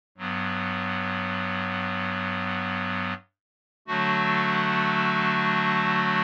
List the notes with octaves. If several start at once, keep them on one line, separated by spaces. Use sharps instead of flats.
G2 F#3 B3
D3 F#3 A3 D4 F#4